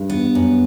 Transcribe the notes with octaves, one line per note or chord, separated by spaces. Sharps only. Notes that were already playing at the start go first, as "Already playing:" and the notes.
Already playing: G2
B3
F#2